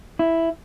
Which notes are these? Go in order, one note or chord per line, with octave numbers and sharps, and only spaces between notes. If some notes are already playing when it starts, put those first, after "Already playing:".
E4